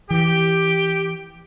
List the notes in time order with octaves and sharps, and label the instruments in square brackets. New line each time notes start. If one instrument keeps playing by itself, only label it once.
[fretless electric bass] E3 [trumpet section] G4 [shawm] G5